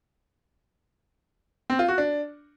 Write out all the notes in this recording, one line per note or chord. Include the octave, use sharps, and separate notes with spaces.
C4
F4
F#4
D4